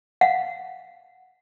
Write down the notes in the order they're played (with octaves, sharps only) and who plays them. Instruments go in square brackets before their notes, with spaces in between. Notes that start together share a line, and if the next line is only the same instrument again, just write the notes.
[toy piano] F5 F#5